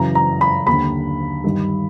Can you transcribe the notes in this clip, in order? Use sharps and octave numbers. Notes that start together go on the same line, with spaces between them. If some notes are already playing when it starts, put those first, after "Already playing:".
Already playing: F#2 C#3 E3 A#5
A#5
B5
D#2 D3 B5
G2 D#3